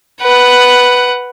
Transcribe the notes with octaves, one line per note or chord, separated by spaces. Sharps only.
B4 F#5